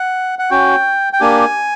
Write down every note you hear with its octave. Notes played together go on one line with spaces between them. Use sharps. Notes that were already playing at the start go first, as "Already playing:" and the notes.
Already playing: F#5
F#5
C#4 F#4 G5
G5
A#3 D4 G4 G#5